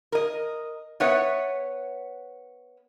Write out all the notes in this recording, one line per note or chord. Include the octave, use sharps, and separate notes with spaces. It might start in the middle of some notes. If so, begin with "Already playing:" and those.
A#4 D#5
B3 B4 C#5 E5 F#5